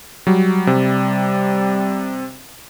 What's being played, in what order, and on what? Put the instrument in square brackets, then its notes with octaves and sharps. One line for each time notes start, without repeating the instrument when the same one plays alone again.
[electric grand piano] F#3 G3
[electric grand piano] C3 [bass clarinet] G3